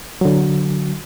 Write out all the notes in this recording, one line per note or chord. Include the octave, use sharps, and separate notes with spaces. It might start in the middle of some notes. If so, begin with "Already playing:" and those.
D3 F#3